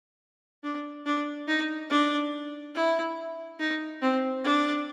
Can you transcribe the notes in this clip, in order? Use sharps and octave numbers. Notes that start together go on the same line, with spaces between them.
D4
D4
D#4
D4
E4
D#4
C4
D4